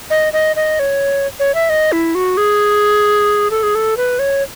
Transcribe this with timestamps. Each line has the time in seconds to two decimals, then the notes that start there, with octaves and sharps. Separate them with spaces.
0.10 D#5
0.33 D#5
0.56 D#5
0.79 C#5
1.40 C#5
1.55 E5
1.69 D#5
1.92 E4
2.15 F#4
2.37 G#4
3.51 A4
3.63 G#4
3.75 A4
3.97 B4
4.19 C#5